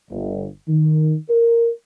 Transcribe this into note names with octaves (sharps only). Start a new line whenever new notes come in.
G1
D#3
A#4